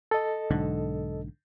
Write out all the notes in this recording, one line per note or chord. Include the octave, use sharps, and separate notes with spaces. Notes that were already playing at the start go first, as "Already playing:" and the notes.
A4 D#5
B1 G#2 D3